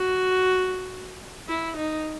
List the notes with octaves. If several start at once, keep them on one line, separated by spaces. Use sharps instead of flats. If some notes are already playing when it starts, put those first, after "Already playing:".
Already playing: F#4
E4
D#4